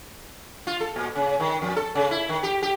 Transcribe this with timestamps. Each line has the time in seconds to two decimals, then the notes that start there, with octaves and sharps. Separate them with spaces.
0.67 F4
0.81 A4
0.96 A#2
1.15 C#3
1.40 D#3
1.62 F2
1.76 A4
1.95 C#3
2.11 E4
2.29 D#3
2.43 G4
2.62 G4